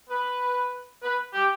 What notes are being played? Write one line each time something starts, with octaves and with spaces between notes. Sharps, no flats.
B4
B4
G4